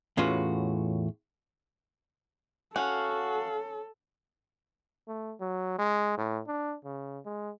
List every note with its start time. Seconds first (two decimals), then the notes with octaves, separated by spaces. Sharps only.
0.17 E2 A2 C#4 F4 F#4 B4
2.76 C#4 F#4 A4 F5 F#5
5.08 A3
5.40 F#3
5.79 G#3
6.18 A2
6.47 D4
6.85 C#3
7.25 G#3